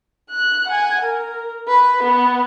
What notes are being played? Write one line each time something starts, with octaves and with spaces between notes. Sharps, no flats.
F#6
F#5 G#5
A#4
B4
B3